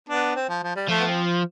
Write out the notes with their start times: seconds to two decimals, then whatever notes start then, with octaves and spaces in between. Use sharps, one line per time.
0.09 B3 D4
0.36 C4
0.49 F3
0.63 F3
0.76 G3
0.89 F3 A3
1.00 B3
1.07 C4